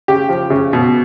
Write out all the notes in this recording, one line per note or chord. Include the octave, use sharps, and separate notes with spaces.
C#3 G4
F3
C#3
B2